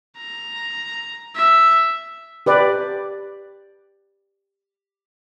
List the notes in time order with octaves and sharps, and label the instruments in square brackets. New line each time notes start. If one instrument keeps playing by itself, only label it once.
[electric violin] A#5
E5
[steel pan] G4 B4 D5